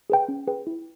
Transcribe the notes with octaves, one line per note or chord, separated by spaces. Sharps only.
G#4 B4 G5
C#4
G#4 B4 G5
E4